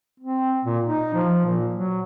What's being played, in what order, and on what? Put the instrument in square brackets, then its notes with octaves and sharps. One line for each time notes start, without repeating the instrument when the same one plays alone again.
[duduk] C4
A#2
D#4
F3
A#2
F#3